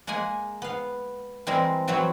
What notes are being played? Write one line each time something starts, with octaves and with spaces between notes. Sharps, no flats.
G#3 A#3 G#4 F#5 G#5
B3 F5
E3 G3 G#3 C4 G#4 A#4
E3 F#3 C4 F#4 C#5 B5